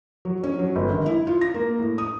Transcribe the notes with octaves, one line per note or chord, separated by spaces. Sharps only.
F#3
C#4
F#3
G1
G#1
E4
F4
A#6
A#3
A2
D#6